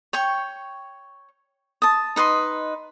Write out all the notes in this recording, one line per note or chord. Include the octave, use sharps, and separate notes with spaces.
C#5 G5 C#6
A5 D#6
D#4 B4 D#5 C6